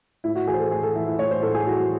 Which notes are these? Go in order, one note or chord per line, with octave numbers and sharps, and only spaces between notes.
A2 E4
F#4
E3 G#4
C5
A4
A2 G#4
A4
E3 E4
E4
A2 C#5
C5
A2 A4
G#4
E3 F#4